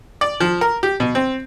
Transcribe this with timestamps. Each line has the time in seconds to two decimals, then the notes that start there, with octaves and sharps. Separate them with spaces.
0.21 D5
0.40 F3
0.61 A#4
0.83 G4
1.00 B2
1.15 C4